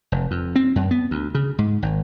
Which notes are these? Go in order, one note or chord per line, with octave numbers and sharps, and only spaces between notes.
F1
F2
C4
F#2
B3
D2
C#3
G#2
G#1